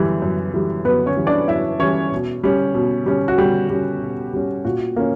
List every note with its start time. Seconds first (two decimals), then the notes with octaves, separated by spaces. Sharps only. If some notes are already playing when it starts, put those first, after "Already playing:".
Already playing: F#2 E3 G3
0.22 F#2
0.54 E3 G3
0.85 F#2 B3 B4
1.06 C#4 C#5
1.17 E3 G3
1.27 D4 D5
1.48 F#2 E4 E5
1.79 E3 G3 C#4 C#5
2.12 B2
2.44 G3 C#4
2.75 B2
3.06 G3 C#4
3.28 F#4
3.38 B2 G3 G4
3.70 G3 C#4
4.01 B2
4.33 G3 C#4
4.65 A#2 F#4
4.96 A#3 C#4